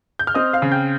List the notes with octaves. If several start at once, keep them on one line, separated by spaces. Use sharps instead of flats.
G6
F6
C4 D#5 D#6
F5 F6
C#3
G5 G6